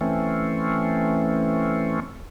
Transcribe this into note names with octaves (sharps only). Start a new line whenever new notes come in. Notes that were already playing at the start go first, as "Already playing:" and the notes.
E3 A3 C4 C#4